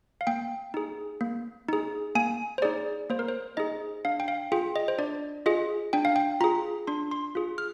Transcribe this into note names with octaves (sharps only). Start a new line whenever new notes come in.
F5
A#3 G5
D#4 G#4
A#3
D#4 G#4
A#3 G#5
C5
D#4 G#4 D5
A#3 C5
A#4
C5
D#4 G#4 D#5
D4 F5
G5
F5
F4 G#4 G5
D#5
C5
D4 D5
F4 G#4 D#5
D4 G5
F5
G5
F4 G#4 A#5
D4 C6
C6
F4 G#4
F6